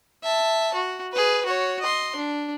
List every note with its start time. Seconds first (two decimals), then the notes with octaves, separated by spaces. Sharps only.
0.23 E5 A5
0.74 F#4
1.13 G#4 B4
1.46 F#4 C#5
1.81 D#5 C6
2.16 D4